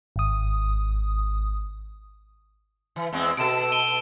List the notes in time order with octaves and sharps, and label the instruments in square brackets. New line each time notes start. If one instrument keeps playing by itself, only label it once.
[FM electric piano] G#1 D#6
[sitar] E3
E2 G#3 C4
[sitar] B2 A4 [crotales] D7 E7
[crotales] D7 D#7 G7